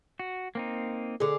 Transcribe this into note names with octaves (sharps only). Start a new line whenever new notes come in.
F#4
A#3 C4 D#4
D3 G#4